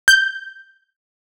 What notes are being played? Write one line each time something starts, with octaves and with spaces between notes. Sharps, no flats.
G6